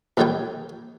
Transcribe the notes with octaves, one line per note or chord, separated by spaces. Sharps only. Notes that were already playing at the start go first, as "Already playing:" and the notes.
A#1 D#2 D3 G3 C#5 G5